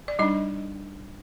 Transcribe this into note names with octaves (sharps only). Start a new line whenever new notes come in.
D5
G3 D4 D#4 D#5